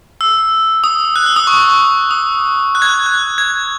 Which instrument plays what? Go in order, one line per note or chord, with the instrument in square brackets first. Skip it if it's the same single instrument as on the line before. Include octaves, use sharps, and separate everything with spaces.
[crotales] E6
D#6
F#6
E6
D#6
C#6
D#6
F#6
G#6
F#6
F#6
G#6